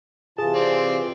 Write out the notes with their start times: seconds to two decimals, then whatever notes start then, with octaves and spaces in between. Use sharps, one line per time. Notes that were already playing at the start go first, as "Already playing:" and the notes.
0.38 C3 E3 F4 G#4 A5
0.55 C4 D5